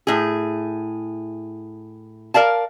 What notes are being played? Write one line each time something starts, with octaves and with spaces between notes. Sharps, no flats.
A2 G#4
A#4 D5 F5 A5